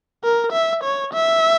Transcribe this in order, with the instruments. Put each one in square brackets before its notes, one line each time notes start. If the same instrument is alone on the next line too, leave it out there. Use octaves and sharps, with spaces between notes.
[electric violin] A#4
E5
C#5
E5